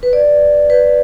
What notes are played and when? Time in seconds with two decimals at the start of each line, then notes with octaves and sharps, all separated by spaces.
0.03 B4
0.13 D5
0.70 B4